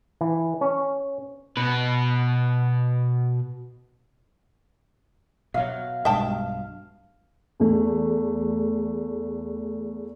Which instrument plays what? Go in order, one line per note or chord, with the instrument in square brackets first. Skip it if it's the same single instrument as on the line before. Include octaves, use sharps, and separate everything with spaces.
[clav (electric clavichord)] E3
C#4
[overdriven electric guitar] B2 B4
[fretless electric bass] B2 F#3 [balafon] E5 [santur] F5
[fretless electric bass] B1 G2 B2 [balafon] G#3 [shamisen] E5 G5 A5
[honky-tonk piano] E2 A3